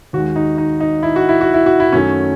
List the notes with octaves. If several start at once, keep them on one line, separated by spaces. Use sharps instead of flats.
D#2 D#3 G#3 F#4
D#4
D#4
D#4
E4
F#4
E4
F#4
E4
F#4
E4
F#2 D#3 F#3 A3 C#4